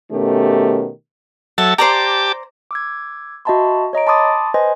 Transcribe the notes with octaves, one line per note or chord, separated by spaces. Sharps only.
B2 D#3 A3 C#4 G4
F#3 A4 E5 A5
G4 C5 D5 A5 A#5 D6
D6 E6 G#6
F#4 D#5 E5 A5 B5 C6
C#5 D#5 A#5 D7
A5 B5 C6 D6 D#6 A6
B4 C5 D#5 G#5 C6